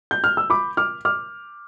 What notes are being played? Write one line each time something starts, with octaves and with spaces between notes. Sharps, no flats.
G6
F6
E6
B5 D6
D6 F6
D6 F6